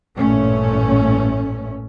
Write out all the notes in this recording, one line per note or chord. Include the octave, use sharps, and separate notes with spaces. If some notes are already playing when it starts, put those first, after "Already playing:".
A1 G2 A#2 A3 C#4